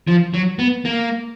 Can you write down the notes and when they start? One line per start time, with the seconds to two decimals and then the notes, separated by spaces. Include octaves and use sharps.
0.08 F3
0.34 F#3
0.59 B3
0.85 A#3